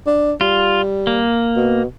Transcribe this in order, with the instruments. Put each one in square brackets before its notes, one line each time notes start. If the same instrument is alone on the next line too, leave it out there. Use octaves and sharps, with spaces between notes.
[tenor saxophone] D4
[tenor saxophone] G3 [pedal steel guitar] F4
[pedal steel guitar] A#3
[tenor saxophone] B2